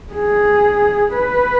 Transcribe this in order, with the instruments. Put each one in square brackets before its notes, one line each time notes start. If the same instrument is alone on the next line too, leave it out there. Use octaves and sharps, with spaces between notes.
[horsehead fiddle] G#4
B4